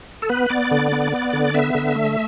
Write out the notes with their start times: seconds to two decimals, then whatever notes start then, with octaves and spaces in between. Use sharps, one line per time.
0.22 A4
0.29 B3 B4
0.50 B3 D5
0.71 D3
0.92 B3
1.12 B3
1.33 D3
1.54 B3 E5
1.75 D3
1.95 A3